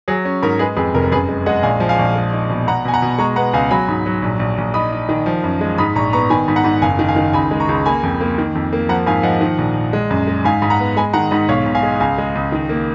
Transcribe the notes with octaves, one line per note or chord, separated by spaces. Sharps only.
F#3 G#4
C#4
G#2 A#4
G#3 G#4 B4
F2 G#4 B4
F1 A#4
F#2 G#4 B4
G#3
G#3 D#5 F#5
A#1 F5 G#5
F3
F5 G#5
A#1
G#3
D#4
B2
B2 F#5 A#5
B2 G#5
F#5 A#5
B2
G#3 A#5 C#6
B3 F#5 A#5
C#2 F5 G#5
F#3 G#5 B5
G#2
F#3
A#1
A#1
A#1
D#4 B5 D#6
D#4
D#3
F3
F#2
G#3
G#2 B5 D#6
A#1 A#5 C#6
B3 A#5 C#6
D#3 G#5 B5
G#2
F#5 A#5
G#2
F#1 F5 G#5
D#3
F5 G#5
D#3
C#2 G#5 B5
G#3
A#5 C#6
C#2
A#3 G#5 B5
F2
A#3
D#3
F2
A#3
F3 F#5 A#5
G#2 F5 G#5
F3 D#5 F#5
D#3
A#1
A#1
G#3
F#2
G#3
G#2 F5 G#5
G#2
F#5 A#5
B3
G#3 G#5 B5
D#3 F#5 A#5
G#2 D#5 F#5
B1 C#5 F5
B1
F5 G#5
G#3
C#2 F5 G#5
G#3
C#2
D#3
A#3